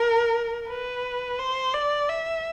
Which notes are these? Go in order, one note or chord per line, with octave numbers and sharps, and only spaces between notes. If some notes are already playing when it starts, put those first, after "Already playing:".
Already playing: A#4
B4
C5
D5
E5